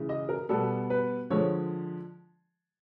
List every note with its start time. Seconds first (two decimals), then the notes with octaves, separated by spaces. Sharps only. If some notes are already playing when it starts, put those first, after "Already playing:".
Already playing: C#3 E3 G#3
0.09 D#5
0.29 A#4
0.49 B2 G3 B3 A4
0.90 B4
1.30 D3 F3 G#3 C#5